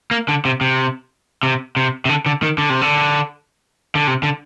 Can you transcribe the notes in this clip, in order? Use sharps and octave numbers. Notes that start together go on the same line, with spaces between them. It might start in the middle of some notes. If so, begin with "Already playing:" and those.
A#3
D3
C3
C3
C3
C3
C3
D3
D3
D#3
D3
C3
D3
D3
C3
D3